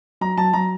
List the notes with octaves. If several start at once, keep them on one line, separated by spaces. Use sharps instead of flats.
F#3 A#5
F#3 A5
F#3 A#5